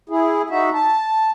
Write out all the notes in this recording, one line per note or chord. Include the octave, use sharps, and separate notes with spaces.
E4 G#4
D#4 F#4 E5
A5